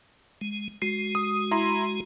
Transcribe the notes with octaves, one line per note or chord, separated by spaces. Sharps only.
G#3
G#3 F#4 C7
D#6
E4 A#5 C6